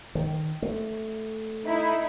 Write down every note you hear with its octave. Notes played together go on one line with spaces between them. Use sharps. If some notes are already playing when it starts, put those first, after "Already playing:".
D#3
A3
D#4 E4